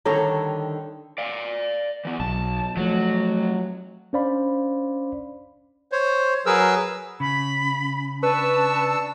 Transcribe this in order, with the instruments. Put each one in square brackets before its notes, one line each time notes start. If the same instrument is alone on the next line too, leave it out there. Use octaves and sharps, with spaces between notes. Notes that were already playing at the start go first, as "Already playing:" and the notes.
[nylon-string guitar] D3 D#3 G3 [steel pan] A4 C#5 A#5
[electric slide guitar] D5 F5
E3 B3
[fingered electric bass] B1 [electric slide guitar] A5
[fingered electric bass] F3 A3 [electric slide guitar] F#3
[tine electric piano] C#4 D4 C5 D5 F5 B5
[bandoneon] C5 C#5
F#3 G#4 A#4 B4 E6
[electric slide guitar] C#3 [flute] B5
[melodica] D4 C#6 E6 [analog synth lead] B4 [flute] A5